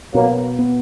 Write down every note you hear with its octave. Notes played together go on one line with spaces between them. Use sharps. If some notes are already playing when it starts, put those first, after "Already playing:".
B2 F#3 A#3
B3